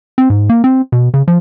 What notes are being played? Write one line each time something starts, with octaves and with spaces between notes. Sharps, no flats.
C4
G#2
A#3
C4
B2
C#3
F3